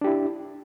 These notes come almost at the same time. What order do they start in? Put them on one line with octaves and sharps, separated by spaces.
D4 G4 E4